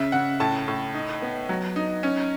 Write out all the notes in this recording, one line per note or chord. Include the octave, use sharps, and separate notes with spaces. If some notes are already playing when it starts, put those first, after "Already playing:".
Already playing: C#3 E5
C#3 F#5
A2 A5
A2
D#4
B3
F#3
D#4
C#4